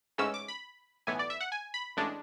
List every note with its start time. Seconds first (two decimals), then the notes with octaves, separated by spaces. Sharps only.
0.18 A1 G#2 E3 G#3 C#4 E6
0.34 D6
0.48 B5
1.07 B1 A2 E3 B3 G#5
1.19 D5
1.30 E5
1.40 F#5
1.52 G#5
1.74 B5
1.97 A1 A2 G#3 D4